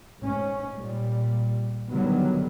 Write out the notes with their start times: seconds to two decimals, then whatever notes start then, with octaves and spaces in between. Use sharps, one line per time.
0.20 G#2 C#4
0.77 A#2 G3
1.91 D3 D#3 F#3 G3 B3